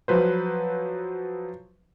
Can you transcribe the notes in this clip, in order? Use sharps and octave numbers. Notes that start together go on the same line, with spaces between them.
F3 F#3 B4 C5